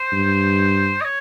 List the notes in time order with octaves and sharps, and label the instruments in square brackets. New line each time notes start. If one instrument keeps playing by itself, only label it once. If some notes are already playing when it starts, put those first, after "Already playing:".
Already playing: [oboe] C5
[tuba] G2
[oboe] D#5
C#5